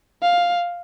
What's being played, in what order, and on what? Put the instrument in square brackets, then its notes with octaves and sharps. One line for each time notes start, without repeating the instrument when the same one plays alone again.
[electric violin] F5